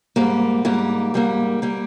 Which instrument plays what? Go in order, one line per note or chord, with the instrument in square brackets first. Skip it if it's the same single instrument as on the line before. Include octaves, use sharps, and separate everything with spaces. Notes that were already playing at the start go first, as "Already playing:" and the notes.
[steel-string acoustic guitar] G#2 G3 A#3
G#2 G3 A#3
G#2 G3 A#3
G3 A#3